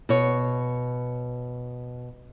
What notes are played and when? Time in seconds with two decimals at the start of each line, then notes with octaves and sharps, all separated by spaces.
0.09 B2 C#5